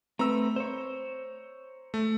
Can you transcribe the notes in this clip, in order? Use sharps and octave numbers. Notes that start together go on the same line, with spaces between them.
A3 C4 B4 A#5 E6
C5 C#5
A3